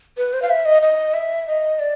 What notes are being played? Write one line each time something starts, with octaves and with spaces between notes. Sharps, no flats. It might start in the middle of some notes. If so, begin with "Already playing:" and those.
B4
C5
F5
E5
D#5
D#5
E5
D#5
D5